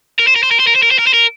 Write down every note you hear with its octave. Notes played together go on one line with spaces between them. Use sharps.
A#4
C5
A#4
C5
A#4
C5
A#4
C5
A#4
C5
A#4
C5
A#4